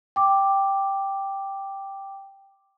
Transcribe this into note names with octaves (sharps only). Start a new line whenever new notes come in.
G5 D6